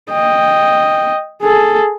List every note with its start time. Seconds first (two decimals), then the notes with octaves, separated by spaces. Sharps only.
0.10 D#5 G5
1.42 G#4 A4